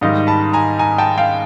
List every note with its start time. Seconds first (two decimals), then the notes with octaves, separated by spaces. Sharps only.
0.01 G#2 D#3 G3 D#5 F5
0.27 A5 B5
0.53 G#5 A#5
0.79 G#5 A#5
0.98 G5 A5
1.18 F5 G5